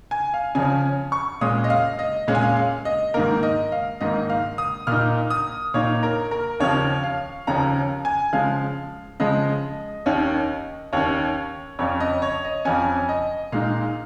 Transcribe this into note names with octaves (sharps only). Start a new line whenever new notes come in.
G#5
F5
C#3 F3 C#4 G#5
C#6
A#2 G#3 C#4 D#6
D#5
F5
D#5
A#2 G#3 C#4 F5
G#5
F5
F5
D#5
G#2 D#3 A#3 A#4
D#5
F5
G#2 D#3 A#3 D#5
F5
D#6
A#2 A#3 D#4 F6
D#6
A#2 A#3 D#4 C#5
A#4
A#4
D#2 C#3 F3 C#4 C#5
F5
D#2 C#3 F3 C#4 A#5
G#5
C#3 F3 G#3 F5
C#3 F3 G#3 D#5
D#2 D#3 C#4
D#2 D#3 C#4 C#5
F2 F3 C#4 C#5
D#5
C#5
D#5
F2 F3 C#4 G#5
D#5
A#2 G#3 D#4 F5